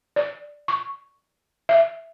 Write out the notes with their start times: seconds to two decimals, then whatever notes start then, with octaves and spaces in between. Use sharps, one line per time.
0.16 D5
0.68 C#6
1.69 E5